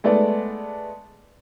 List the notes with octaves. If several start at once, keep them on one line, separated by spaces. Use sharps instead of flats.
G#3 A3 B3 D5